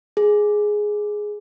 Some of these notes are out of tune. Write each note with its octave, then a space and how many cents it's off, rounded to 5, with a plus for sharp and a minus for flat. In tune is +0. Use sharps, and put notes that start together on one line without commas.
G#4 +5